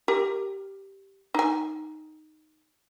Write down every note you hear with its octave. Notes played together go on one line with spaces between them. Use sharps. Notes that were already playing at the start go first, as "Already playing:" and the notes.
G4 A#4
D#4 G#5